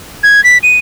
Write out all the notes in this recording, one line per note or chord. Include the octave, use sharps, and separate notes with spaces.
G#6
B6
D#7